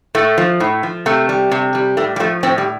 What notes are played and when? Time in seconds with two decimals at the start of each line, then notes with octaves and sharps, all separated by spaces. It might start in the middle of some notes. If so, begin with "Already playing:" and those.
0.15 A2 A3
0.38 F3
0.60 A2
0.83 F3
1.06 C3 A3
1.29 G3
1.51 C3
1.75 G3
1.97 A2 A3
2.16 G3
2.20 F3 A3
2.43 A2 C4
2.58 G3